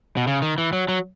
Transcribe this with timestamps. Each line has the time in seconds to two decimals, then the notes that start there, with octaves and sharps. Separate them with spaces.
0.17 B2
0.27 C#3
0.42 D#3
0.58 E3
0.73 F#3
0.89 F#3